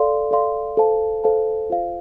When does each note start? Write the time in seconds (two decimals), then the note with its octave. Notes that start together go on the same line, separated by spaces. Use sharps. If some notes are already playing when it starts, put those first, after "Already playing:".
Already playing: A4 D5 F5 C6
0.31 A4 D5 F5 C6
0.77 A4 C5 F5 A5
1.24 A4 C5 F5 A5
1.70 F4 C5 F5